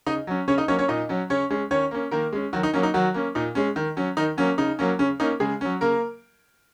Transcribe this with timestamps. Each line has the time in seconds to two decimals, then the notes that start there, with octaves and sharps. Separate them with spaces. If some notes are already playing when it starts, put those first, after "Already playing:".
0.06 C#3 D#4 D#5
0.27 F#3 C#4
0.48 C#3 C#4 C#5
0.58 D#4 D#5
0.68 F#3 A#3 C#4 C#5
0.78 C#4 C#5
0.88 A#2 D#4 D#5
1.09 F#3 C#4
1.30 C#3 C#4 C#5
1.50 G#3 C#4
1.71 D#3 C#4 C#5
1.91 A#3 C#4
2.11 D#3 A#3 A#4
2.32 G#3 C#4
2.53 D#3 F#3 F#4
2.63 D#4
2.74 F#3 A#3 C#4
2.83 D#4
2.94 D#3 F#3 F#4
3.14 A#3 C#4
3.35 A#2 D#4
3.55 G#3 C#4
3.76 D#3
3.97 F#3 C#4
4.17 D#3 D#4
4.37 F#3 A#3 C#4
4.58 C#3 D#4
4.79 F#3 A#3 C#4
4.99 C#3 C#4
5.20 A#3 C#4 D#4
5.40 C#3 G#3 G#4
5.61 F#3 C#4
5.81 C#3 A#3 A#4